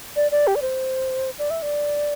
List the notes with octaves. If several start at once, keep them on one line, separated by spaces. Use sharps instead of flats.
D5
D5
G4
D5
C5
D5
E5
D5